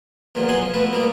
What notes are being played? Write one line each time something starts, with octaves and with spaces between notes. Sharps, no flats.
E2 A#2 F3 F#3
B1 F#3 F#5 G#5 C6
F3
B2 F3 A3 B4
A#2 G3 A#3 D#4